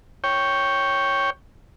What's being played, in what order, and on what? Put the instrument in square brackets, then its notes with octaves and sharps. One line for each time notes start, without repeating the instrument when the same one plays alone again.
[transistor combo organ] C#5 G5